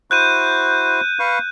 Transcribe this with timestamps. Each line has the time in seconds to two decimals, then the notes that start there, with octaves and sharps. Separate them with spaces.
0.11 E4 F#4 C5 F#6 G6 D#7
1.19 B4 F5 C#6